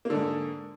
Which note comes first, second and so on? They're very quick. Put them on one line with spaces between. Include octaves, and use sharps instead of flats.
A#3 D3 G#2